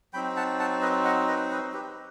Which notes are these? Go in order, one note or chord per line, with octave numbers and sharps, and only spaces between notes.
F#3 C4 D#4 G5 B5
F#5 A5
F#5 A5
B4 D#5
D#5 F#5
B4 D#5
B4 D#5
G4 B4